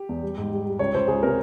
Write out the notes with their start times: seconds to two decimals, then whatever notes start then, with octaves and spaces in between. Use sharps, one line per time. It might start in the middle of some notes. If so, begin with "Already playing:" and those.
Already playing: G4
0.09 E2
0.22 G3
0.38 G#2
0.52 G3
0.66 G3
0.79 C#2 C#5
0.94 C#2 C5
1.08 C#2 G#4
1.23 C3 A#4